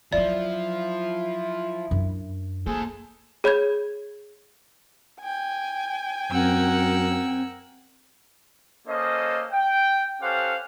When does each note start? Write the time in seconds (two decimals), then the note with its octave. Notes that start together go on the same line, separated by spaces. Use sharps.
0.13 F3 F#3 C#4 E4 D5
1.91 F#2 D4
2.67 A#3 G#4 A4 C5
3.44 G#4 C#5 B5 G6 G#6
5.21 G5 G#5
6.31 F#2 C4 A#4 F#5 E6
8.88 A#3 C#4 A4 C5 D#5
9.52 G5
10.22 C#4 G4 A4 C5 F5 F#5